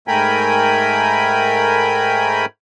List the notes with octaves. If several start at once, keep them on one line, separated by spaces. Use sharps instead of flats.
G#2 A3 A#4 G5 G#5 B5